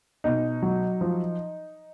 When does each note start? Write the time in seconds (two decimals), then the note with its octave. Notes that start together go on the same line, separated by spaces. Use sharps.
0.24 B2 D#4
0.62 F#3
1.01 F3